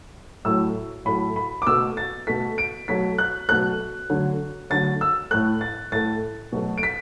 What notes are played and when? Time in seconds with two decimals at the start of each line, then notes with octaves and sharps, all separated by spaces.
0.45 A2 F#3 A3 E6
1.05 A2 F#3 A3 B5
1.36 B5
1.62 D6
1.67 B2 A3 E6
1.97 A6
2.27 B2 A3 B6
2.58 D7
2.88 B2 F#3 A3 B6
3.18 F#6
3.48 B2 F#3 A3 F#6
4.09 D3 F#3 A3
4.70 D3 F#3 A3 A6
5.01 E6
5.31 A2 A3 F#6
5.61 A6
5.92 A2 A3 A6
6.52 B2 F#3 A3
6.78 D7
6.83 B6